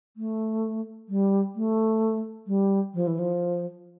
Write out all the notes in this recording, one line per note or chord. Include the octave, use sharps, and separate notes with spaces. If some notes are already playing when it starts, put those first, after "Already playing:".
A3
G3
A3
G3
F3
E3
F3